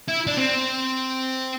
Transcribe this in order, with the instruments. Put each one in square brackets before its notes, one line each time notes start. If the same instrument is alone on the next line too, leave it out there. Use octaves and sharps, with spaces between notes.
[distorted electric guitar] E4
D4
C4